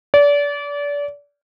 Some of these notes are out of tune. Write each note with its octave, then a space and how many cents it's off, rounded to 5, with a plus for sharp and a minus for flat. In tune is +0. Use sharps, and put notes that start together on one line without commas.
D5 -30